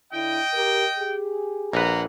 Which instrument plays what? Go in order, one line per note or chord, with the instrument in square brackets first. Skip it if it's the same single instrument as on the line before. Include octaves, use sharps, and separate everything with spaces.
[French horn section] D3 D4 E4 [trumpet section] D#5 G5
[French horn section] G4 A#4
G4 G#4
[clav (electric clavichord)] A#1 B4 [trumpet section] A#3 F#5 A#5